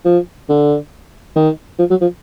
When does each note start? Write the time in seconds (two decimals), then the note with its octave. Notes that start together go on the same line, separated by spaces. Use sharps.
0.05 F3
0.49 D3
1.36 D#3
1.79 F3
1.90 F#3
2.01 F3